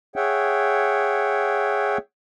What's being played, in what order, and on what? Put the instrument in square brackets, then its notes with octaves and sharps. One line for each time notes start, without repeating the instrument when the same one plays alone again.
[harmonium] G#4 C#5 E5 F#5 G5